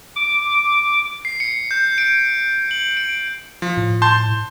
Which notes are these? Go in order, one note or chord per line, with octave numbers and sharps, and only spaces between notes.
D6
C7
C#7
G6
D7
F#7
D7
F3
A2
A5 C6 G6